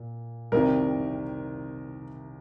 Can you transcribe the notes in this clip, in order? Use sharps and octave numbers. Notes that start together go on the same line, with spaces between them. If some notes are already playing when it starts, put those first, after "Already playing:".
Already playing: A#2
C2 C3 D#3 A#4